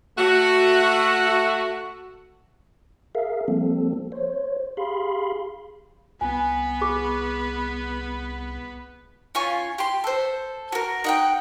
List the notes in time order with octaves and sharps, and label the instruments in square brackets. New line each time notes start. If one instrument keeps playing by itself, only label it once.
[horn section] A3 F#4
[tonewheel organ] G#4 A#4 E5 F5
F3 G3 A#3 C4 A4
C5 C#5
G4 G#4 F5 B5 C6
[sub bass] C2 [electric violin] B3 B4 [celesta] G#5
[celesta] G#4 D6
[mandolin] C#4 F4 G#5 C#6
G4 C6
A4 C5
F#4 A#4
D#4 F#5 G5